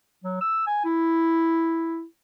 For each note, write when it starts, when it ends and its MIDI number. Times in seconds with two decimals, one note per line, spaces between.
0.24 0.36 54
0.41 0.62 88
0.67 0.80 80
0.85 2.04 64